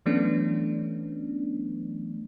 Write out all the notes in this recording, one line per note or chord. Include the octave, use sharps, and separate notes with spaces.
E3 F#3 A3 B3 C#4 D4